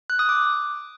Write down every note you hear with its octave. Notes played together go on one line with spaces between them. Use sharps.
F#6
D#6
D6